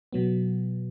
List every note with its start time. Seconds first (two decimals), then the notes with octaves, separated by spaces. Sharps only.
0.13 B2 F#3 B3